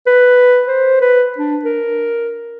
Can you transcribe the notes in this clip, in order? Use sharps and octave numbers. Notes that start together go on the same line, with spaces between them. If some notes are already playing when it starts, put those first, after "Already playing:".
B4
C5
B4
D4
A#4